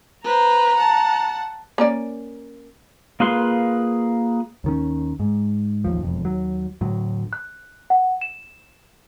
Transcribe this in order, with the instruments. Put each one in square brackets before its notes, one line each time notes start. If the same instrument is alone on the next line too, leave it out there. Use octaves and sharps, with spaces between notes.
[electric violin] B4 C5 [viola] A#5
[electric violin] F#5 A5
[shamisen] A#3 C#4 D5
[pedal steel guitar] A#3 F4 G#4 B4 C6
[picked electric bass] D#2 D#3 C#4
G#2
A1 D#2 F3
E1 C2 F2
D#2 F#3
D2 A2 F#3
[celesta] F#6
F#5
E7